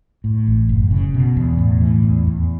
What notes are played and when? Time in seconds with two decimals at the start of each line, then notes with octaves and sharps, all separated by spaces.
0.24 A2
0.47 A1
0.69 F#1
0.91 C#3
1.14 B2
1.36 E2
1.59 A2
1.81 E3
2.03 E2
2.27 E2